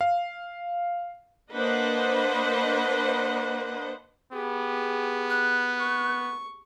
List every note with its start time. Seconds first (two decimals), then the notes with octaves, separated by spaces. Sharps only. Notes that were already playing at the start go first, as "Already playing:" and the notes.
0.01 F5
1.51 A#3 D4 B4 C5 D#5 F#5
4.33 B3 G4 G#4
5.30 F#6
5.79 C#6